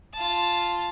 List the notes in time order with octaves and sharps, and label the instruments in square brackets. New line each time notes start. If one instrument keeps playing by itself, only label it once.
[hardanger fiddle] F4 A5